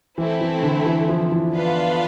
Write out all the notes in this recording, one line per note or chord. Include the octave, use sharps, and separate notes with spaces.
E3 A3 C4 E4
E3
D3
E3
F3
E3
B3 D4 F4 B4 F5